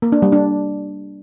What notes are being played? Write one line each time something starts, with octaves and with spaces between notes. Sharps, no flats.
A#3
D4
G3
D4